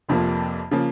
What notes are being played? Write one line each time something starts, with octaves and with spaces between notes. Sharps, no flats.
F1 F2 C3 F3 A#3
C#3 F3 A#3